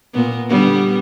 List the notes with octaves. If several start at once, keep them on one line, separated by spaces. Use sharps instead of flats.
A#2 B3
D3 G3 B3